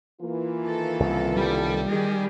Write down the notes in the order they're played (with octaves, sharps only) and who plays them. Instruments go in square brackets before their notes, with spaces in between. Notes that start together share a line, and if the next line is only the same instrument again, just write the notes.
[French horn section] E3 A#3 F4
[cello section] D#3 A4
[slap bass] C2 C#3
[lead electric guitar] G3
[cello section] D#3 G4 G#4